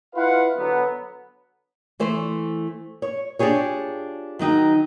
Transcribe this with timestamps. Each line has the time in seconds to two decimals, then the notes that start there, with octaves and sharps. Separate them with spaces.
0.14 E4 F4 B4 F5 F#5
0.57 D3 F#3 B3
2.00 E3 A3 C5
3.02 C#5
3.39 D4 F4 G4 G#4 C#5
4.39 D#3 F#3 D#4 G5